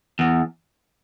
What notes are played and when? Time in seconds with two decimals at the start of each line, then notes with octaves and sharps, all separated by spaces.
0.19 E2